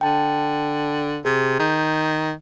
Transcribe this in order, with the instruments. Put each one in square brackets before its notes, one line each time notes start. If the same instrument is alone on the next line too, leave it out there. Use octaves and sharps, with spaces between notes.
[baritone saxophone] D3 [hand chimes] G5 A5
[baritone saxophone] C3 [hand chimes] G#4
[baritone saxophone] D#3 [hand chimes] G6